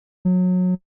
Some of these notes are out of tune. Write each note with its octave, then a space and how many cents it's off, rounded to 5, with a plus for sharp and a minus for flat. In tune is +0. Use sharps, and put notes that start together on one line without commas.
F#3 -25